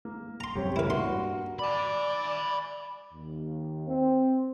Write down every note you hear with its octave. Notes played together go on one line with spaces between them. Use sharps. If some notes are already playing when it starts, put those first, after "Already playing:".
A#3
A#5 C6
C2 F#2 C3 G4 C#5
C#2 C#3 E3 A#3 E4 A#4 B4
G2 F#4 C6
D5 G#5 B5
D#2
C4